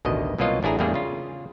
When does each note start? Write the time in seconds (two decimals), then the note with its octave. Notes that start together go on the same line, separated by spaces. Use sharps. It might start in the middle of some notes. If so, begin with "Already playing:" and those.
0.05 A1 D2 B2 D#3 D#5
0.38 C2 B2 F#3 A#3 F4 D#5
0.63 A1 D4 E4 G#4 A#5
0.79 E2 A2 G3 A#3 D4 G#4
0.94 C#3 F4